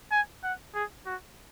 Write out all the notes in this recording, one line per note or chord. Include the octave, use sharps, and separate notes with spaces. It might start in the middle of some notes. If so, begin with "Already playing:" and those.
G#5
F#5
G#4
F#4